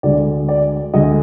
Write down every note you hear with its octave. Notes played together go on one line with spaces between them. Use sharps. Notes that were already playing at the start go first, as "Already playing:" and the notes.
D2 D3 G#3 D5
D5
D2 D3 G#3 D#5